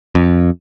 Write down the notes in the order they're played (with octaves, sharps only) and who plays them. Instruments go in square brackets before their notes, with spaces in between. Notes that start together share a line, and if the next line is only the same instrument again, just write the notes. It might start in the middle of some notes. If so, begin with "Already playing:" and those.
[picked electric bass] F2